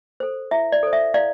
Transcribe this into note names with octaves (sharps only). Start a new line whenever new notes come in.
A4 C5
E4 E5
D5
A4 C5
E5
E4 D5 F5